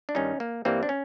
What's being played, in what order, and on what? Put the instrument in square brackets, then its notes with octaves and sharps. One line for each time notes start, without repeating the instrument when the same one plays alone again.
[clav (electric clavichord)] D4
G2 D#3 G3 C#4 D#4
A#3
G2 E3 G3 A#3 C4
D4
C#4